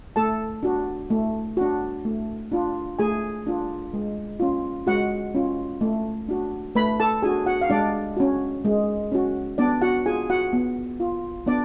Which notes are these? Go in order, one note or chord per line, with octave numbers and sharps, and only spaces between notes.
A3 A4 A5
D4 F#4
A3
D4 F#4
A3
D4 F4
A3 G#4 G#5
D4 F4
G#3
C#4 F4
G#3 F#4 F#5
C#4 F4
A3
D4 F#4
A3 B4 B5
A4 A5
D4 F#4 G#4 G#5
F#4 F#5
F5
G#3 D4 D5
C#4 F#4
G#3
C#4 F#4
B3 D4 D5
F#4 F#5
F4 G#4 G#5
F#4 F#5
B3
F4
B3 D4 D5